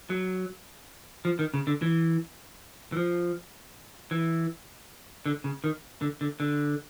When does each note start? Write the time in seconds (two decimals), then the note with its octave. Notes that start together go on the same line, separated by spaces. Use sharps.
0.10 F#3
1.25 F3
1.39 D#3
1.54 C#3
1.67 D3
1.82 E3
2.92 E3
2.97 F3
4.11 E3
5.26 D3
5.44 C#3
5.64 D#3
6.01 D3
6.21 D3
6.40 D3